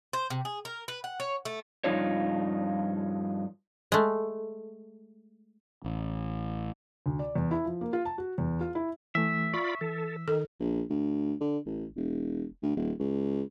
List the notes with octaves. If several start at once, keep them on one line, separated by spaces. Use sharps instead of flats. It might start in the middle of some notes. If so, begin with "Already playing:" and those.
C5
C3
G#4
A#4
B4
F#5
C#5
A3
G2 B2 F3 D#4 F4 C#5
G#3 A3
A1
D2
D5
E2
E4
F3
A#3
F4
A5
F#4
E2
F4
E4
E3 A3 E5
F4 D5 B5 C#6
E3 A4
D#3 A4
A#1
D2
D3
A1
E1
D2
D#1
C#2